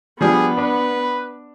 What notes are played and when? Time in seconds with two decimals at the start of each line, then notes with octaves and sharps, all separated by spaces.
0.21 F3 G3 B3 D4 G#4
0.58 D4 B4